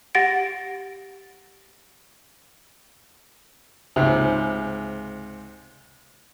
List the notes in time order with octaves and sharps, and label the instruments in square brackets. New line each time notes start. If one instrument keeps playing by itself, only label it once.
[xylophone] G4 F#5 A6 A#6 D7
[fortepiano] C#2 G#2 C3